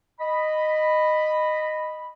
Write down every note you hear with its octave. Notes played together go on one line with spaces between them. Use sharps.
D#5 B5